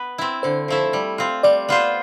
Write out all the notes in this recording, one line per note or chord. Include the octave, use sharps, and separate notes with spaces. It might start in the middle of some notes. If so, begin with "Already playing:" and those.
Already playing: B3 B4
C4 E4
D3 C5
F3 A3 E4
G3
C4 F4
G3 D5
B3 F4 C5